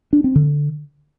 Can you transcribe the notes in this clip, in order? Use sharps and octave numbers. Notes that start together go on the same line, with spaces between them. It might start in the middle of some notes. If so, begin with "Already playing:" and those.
D4
C4
D3